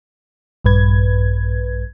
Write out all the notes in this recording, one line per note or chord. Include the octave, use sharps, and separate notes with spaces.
A#1 G2 B4 G#6